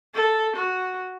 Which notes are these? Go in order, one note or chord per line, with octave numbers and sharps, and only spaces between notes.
A4
F#4